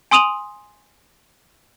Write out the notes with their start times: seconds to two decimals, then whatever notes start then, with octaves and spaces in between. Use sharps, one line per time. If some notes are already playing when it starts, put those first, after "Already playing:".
0.11 G#5 C6 D#6 D#7 F7 F#7